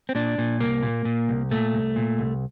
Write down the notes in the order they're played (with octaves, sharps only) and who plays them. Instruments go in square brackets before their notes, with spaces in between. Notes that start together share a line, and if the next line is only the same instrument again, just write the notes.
[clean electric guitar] C4
A#2 D4
A#2
C2 A#3
A#2
A#2
C2
A#2 A3
C2
A#2
C2